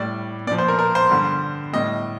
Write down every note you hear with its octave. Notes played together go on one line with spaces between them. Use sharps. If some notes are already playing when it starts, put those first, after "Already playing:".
Already playing: A2 G3 D5
A#2 F3 D5
C5
A#4
A#4
C5
G2 D3 G3
A2 G3 D#5